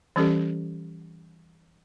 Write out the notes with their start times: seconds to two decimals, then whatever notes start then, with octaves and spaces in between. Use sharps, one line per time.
0.16 E3 G3 C#4 G4 A4